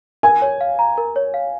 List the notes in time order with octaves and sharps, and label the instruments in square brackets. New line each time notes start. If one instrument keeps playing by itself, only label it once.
[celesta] A#4 [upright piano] G#5
[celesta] C#5
F5
A#5
A#4
C#5
F5